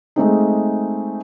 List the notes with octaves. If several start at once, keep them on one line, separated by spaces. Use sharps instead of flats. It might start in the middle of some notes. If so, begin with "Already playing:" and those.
G#3 A3 C4 D#4